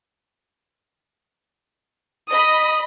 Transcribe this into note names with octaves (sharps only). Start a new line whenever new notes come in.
D#5 B5 D#6